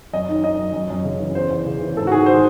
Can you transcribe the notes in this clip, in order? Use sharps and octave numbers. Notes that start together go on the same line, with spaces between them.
F#2 D#5
D#3
D#3 D#5
F#2
F#2
F#2
C#3
E3
E2 C5
E2
C#3
E3
G#2 A4
F#4
D#3 G#4
D#3 C5